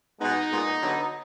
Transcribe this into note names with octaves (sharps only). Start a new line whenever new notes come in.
B2 G#3 B3 D#4
A#2 G#3 B3
D3 F#3 B3